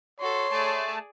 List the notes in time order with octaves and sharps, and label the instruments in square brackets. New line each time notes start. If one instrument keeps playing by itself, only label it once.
[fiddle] F#4 A4 [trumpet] C#5 [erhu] C6
[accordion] A3 A5 [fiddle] G#4 D5